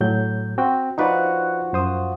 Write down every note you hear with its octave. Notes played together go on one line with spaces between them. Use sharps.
A2 F#3 G6
C4 F#4 G5
F3 D#4 F#4 B4 D5
F#2 C5 D#6